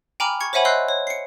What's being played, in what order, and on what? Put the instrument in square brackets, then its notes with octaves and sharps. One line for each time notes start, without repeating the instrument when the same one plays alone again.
[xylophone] G5 G#5 A#5 B5 D6 F6
C#6 G#6 C#7
C5 C#5 E5 F#5 G#5 B5
D#5 C6 E6 F#6 G6 C7
C#5
C7 C#7